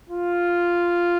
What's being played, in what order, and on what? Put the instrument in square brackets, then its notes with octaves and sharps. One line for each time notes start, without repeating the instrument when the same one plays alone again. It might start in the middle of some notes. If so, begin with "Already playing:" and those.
[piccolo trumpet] F4